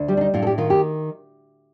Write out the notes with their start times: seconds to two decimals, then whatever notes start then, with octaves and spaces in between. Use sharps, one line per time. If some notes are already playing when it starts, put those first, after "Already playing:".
Already playing: D2
0.08 G3 G4
0.17 D4
0.21 D#4
0.34 A2 F4
0.42 A4
0.47 G4
0.58 D#3 F4
0.70 G4